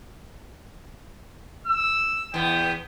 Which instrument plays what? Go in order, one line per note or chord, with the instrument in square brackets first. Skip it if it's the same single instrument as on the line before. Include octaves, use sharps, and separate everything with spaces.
[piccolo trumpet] E6
[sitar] E2 B3 [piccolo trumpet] G5